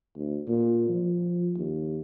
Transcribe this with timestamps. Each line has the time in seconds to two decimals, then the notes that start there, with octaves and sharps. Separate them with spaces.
0.17 D2
0.47 A#2
0.89 F3
1.57 D#2